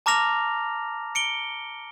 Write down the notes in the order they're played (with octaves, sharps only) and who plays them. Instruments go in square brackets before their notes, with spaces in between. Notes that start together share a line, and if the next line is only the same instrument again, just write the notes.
[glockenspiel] A5 A#5 D6 F6 A#6 F7
C#7 D7 G7